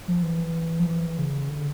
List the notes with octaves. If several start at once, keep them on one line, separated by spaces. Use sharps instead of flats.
F3
E3
F3
E3
C#3
D3